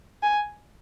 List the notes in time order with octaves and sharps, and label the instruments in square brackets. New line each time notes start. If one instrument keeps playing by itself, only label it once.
[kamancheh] G#5